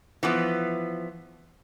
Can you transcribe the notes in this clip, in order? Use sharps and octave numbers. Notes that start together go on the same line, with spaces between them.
E3 F3 B3